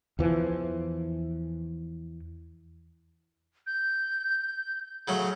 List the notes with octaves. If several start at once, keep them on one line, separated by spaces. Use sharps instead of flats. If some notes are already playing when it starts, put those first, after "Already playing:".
E2 E3 F3
G6
C#3 F#3 A3